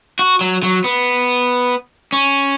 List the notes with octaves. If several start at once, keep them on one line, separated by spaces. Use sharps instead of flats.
F#4
F#3
F#3
B3
C#4